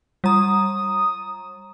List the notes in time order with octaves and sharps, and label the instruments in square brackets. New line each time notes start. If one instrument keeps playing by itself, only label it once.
[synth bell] G3 A#5 [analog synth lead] D#6